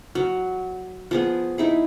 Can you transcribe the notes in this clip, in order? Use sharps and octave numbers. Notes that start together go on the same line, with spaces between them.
F#3
F3 B3 G#4
D#4 E4 G#4